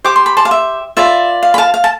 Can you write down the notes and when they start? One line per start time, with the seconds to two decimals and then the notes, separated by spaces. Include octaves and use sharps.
0.04 G4 C5 D6
0.16 C6
0.26 B5
0.37 A5 C6
0.45 F5
0.51 E5
0.97 F4 B4 D5 E5
1.43 F5
1.54 B5
1.58 F5 A5
1.74 F5
1.84 A5